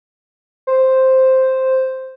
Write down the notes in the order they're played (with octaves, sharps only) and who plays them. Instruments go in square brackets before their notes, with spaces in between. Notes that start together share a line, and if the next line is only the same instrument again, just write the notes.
[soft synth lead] C5